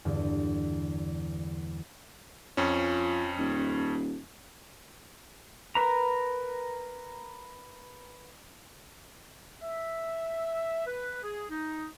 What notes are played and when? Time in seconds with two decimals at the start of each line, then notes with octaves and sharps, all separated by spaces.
0.05 E2 G2 D3
2.57 F2 F3 C#4
3.38 D#1
5.75 A#4 B4 A#5
9.62 E5
10.86 B4
11.23 G#4
11.49 D#4